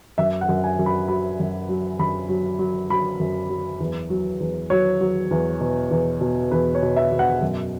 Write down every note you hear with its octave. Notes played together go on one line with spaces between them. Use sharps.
F#2 E5
F#5
F#2
G#5
F#2
B5
F#3 B5
F#2
F#3
F#2 B5
F#3
F#3
F#3 B5
F#2
F#3
E2
F#3
E2
F#3 C#5
F#3
E2
B2
E2
B2
E2 B4
C#5
B2
E5
B2
F#5
F#2